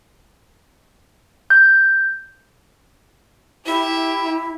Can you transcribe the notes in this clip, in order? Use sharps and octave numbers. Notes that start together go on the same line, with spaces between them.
G6
E4 G4 E5